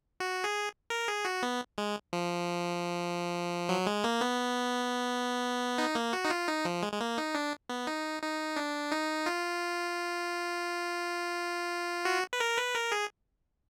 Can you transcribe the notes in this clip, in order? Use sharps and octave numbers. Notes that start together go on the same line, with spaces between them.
F#4
G#4
A#4
G#4
F#4
B3
G#3
F3
F#3
G#3
A#3
B3
D#4
A#3
F#4
D#4
F4
D#4
F3
G#3
G#3
A#3
D#4
D4
B3
D#4
D#4
D4
D#4
F4
F#4
B4
A#4
B4
A#4
G#4